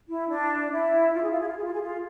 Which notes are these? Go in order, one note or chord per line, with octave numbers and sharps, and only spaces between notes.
E4
D4
E4
F4
G#4
F4
G#4
F4
G#4
F4
G#4
F4